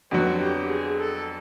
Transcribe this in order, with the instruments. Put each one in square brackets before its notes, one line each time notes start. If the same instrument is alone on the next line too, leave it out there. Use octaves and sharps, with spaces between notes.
[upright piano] F2 D3 F#3 B3 [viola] F#4
[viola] G4
G#4
A4